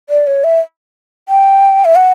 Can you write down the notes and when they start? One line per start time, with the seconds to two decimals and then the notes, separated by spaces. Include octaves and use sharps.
0.10 D5
0.27 C#5
0.44 E5
1.29 G5
1.85 E5
1.96 F#5